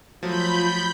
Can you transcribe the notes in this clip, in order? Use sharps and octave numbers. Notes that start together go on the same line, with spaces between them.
F3 F#3 A3 F4 B5 G6